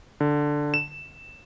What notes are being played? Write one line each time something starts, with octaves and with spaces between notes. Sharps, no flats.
D3
E7